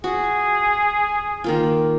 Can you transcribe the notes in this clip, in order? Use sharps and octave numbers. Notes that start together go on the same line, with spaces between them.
F#4 G#4
D#3 A#3 F4